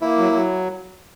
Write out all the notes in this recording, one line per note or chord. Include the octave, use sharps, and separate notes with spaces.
A#3 E4
F#3
F#3